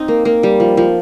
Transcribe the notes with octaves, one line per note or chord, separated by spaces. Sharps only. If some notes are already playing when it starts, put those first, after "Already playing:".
Already playing: C4 D#4
A#3
A#3
G3
F3
F3